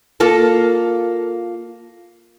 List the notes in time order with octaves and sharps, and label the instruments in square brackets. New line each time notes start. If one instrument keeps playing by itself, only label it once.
[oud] A#3 F4 A4